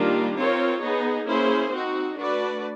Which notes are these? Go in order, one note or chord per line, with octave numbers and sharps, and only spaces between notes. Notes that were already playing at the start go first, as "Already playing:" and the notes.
Already playing: D#3 G3 A#3 D4 F4
C4 F4 A#4 C#5
B3 D#4 G#4
A#3 C#4 E4 G#4 C5
C4 D#4 F#4
A3 D4 F#4 B4 D5